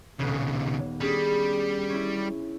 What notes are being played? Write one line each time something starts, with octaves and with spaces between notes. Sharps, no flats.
D#1 B1 C#3 B3
G3 C#4 D4 G#4
C#4 E4